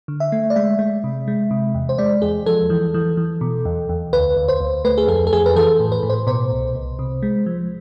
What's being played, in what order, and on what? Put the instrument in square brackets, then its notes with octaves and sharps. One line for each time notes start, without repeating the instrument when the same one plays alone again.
[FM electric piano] D3
E5
A3
D5
G#3 E5
G#3
C3
G#3
C3
E2
C5
G#3 D5
E2 G#4
F3 A4
E3
E3
E3
B2
E2
E2
D2 B4
D2
C5
D2
A3 B4
G#4
F2 A4
A4
F2 G#4
B4
E3 A4
A2
B4
A2
C5
B2 C5
C2
C2
C3
G#3
F3